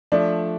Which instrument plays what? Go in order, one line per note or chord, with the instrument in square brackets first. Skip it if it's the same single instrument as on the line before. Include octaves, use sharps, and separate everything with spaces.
[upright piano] F3 A3 [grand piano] D4